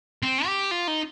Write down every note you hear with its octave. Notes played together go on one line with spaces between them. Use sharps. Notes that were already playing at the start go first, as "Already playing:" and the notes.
C4
G4
F4
D#4